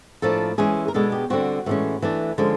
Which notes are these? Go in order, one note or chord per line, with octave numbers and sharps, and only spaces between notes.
A2 F3 A#3 D4 A4
E3 G#3 C#4 G#4
A#4
B2 G#3 B3 D4 A4
G4
D3 G3 C4 F#4
A2 E3 G#3 C#4
E3 A3 D4
D3 F3 G#3 C#4